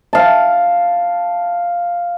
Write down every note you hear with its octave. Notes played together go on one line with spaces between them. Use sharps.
F5 A5